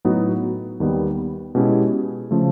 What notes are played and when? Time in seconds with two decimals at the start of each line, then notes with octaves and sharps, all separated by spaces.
0.05 A2 F#3 B3 D#4 F#4
0.80 D#2 D#3 G3 B3
1.55 B2 G#3 C#4 E4 G4
2.31 C#3 F3 A3